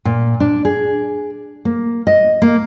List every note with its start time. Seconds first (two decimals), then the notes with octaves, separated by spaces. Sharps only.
0.05 A#2
0.40 D4
0.65 G#4
1.65 A#3
2.07 D#5
2.42 A#3